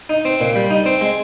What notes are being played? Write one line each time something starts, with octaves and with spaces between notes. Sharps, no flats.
D#4
C4
A#2
G3
D#4
C4
G#3